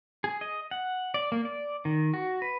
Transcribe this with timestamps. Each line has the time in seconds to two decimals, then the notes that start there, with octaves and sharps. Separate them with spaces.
0.24 G#4
0.41 D#5
0.71 F#5
1.14 D5
1.32 A#3
1.45 D5
1.85 D#3
2.14 F#4
2.42 B4